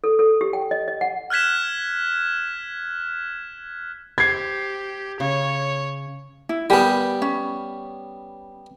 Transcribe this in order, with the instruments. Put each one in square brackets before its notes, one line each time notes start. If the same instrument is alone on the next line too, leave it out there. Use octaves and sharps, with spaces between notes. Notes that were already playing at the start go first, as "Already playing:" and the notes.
[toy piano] A4
A4
G4
G5
D#5
D#5
F#5
[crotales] F6 F#6 G#6 B6 E7
[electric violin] G4 [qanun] C5 [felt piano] G#6 C7
[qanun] C#3 [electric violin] C#5
[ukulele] E4
[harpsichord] G3 B3 [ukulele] G4 A#4 G#5
[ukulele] C#4